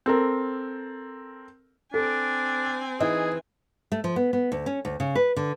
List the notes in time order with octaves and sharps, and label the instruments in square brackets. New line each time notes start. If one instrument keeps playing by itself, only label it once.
[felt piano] C4 A4 A#4
[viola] C4 G#5 [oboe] D4 [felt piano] A4
[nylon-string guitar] E3 [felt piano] D#4 [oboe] G#4
[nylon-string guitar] A3
F3
B3
B3
D2
C#4
D2
C#3
B4
D3